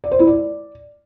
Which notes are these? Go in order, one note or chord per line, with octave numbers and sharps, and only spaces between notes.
D5
C5
E4
D5